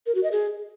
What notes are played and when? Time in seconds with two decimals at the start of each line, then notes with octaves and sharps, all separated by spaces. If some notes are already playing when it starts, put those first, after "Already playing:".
0.06 A#4
0.15 F#4
0.23 D#5
0.32 G#4